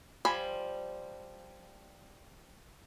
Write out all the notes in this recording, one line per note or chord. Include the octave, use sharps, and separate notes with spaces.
F3 G3 C5 G#5 B5